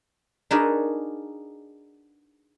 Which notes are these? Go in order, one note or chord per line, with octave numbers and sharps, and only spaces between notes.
D4 D#4 F#4 G#4 A#4 B4